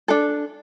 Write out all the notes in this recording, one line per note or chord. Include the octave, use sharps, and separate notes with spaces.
D4 A4